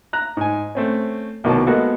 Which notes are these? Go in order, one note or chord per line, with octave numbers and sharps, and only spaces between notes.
A#5 F#6
G#2 G#5
A3 C4 C#4
C2 B2 D#3 F#3 A5
G#3 A#3 B3 F#4 A4